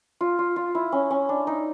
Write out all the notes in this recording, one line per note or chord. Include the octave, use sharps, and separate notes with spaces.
F4
F4
F4
E4
C#4
C#4
D4
D#4